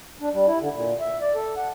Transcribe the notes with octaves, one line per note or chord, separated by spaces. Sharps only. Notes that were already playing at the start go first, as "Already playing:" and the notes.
D4
G3
E4
D3
A#2
E5
D5
A4
F#5